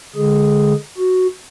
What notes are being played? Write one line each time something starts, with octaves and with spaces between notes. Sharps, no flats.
D3 G#3 G#4
F#4